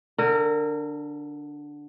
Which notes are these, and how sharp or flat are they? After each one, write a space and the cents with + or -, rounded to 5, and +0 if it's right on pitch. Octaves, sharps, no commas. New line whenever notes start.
D3 +0 A#4 -25